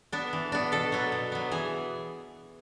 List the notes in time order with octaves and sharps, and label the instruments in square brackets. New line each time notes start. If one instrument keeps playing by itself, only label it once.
[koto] B3 D4
E3
B3 D4
B2 A4
F#3 B3
B2
F#3 B3
E3 G#4